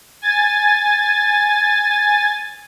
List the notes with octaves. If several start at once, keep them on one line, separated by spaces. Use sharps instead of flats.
G#5 A6